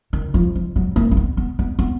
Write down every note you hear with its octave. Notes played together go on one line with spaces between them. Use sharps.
D#3
F3
F3
F#3
A#3
A#3
B3
B3
B3
B3